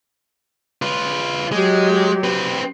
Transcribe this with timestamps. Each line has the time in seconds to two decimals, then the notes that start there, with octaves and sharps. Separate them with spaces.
0.82 F4 B4
1.52 F#3 G#3 G4
2.24 C4 B4